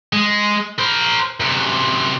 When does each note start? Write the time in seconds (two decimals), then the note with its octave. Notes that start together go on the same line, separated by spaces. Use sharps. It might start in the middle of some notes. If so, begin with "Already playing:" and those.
0.13 G#3
0.78 A#4 C5
1.40 F#2 C3